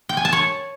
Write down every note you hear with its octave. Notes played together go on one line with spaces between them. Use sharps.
G5
G#5
A5
C#5